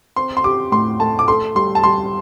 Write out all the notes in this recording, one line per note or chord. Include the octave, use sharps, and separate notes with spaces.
C4 C6
C6
G4 D6
A2 C6
A3 A5
D6
A4 C6
G3 C6
A5
G3 C6